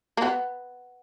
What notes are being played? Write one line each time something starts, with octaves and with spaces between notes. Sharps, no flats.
A#3
B3